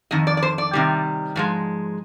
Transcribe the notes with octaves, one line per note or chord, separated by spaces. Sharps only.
F2 D#3 D#5
D5
D5
C5
D5
C3 D#3 G3
G#2 F3 G#3